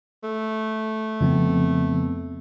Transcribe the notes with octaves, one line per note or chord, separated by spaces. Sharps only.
A3
F2 C#3 F3 B3 C4